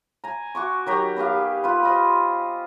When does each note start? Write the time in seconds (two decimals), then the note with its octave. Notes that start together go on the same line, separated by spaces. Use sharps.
0.24 G#5 A#5
0.55 F#4 C#6 D6
0.86 D#3 F#3 G4 A#5
1.16 B3 G4 G#4 F5
1.64 F4 B4
1.83 C5 D#5 B5